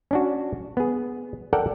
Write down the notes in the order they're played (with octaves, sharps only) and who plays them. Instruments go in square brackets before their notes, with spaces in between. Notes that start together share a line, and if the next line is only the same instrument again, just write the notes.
[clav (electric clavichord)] C#4 D4 F#4
B3 G#4
A4 A#4 D5 F#5 G5